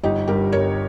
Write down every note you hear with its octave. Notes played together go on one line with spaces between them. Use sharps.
G1 D#4 G4
G2 G3 G4 A#4
G1 A#4 C#5